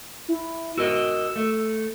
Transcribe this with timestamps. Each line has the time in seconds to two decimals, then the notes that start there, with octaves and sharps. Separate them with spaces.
0.28 E4
0.78 F#4 A#4 D#5 E6
1.36 A3